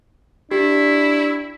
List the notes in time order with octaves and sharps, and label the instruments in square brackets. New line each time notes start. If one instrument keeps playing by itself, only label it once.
[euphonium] D4 [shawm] E4 [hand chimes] G4